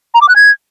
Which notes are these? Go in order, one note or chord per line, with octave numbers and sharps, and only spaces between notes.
A#5
D6
F#6
G#6